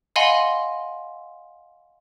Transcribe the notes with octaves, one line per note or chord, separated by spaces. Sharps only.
D#5 F5 F#5 G#5 B5 C6